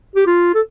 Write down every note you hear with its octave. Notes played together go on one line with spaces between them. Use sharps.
G4
F4
A4